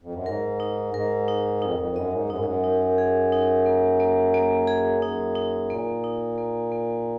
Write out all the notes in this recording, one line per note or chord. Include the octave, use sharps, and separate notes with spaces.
F2
F#2
G#2 A#4
D#4
G#2 A#4
D#4
F2 D#4
F2
F#2 D#5
G#2
F#2 D#4
G#2
F#2
D#4
G#4
D#4
A#3
A#3
A#3
G#4
F#2 D#4
D#4
A#2 A#3
D#4
A#3
A#3